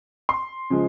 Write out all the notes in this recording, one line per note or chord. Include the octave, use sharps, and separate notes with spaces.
C6
C#3 F3 G#3